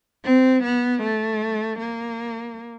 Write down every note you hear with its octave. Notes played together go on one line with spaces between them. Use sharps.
C4
B3
A3
A#3